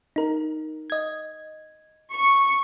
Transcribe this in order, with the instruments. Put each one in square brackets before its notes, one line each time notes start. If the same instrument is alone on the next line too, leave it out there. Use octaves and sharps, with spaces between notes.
[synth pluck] D#4 A#4
D#5 G#6
[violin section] C#6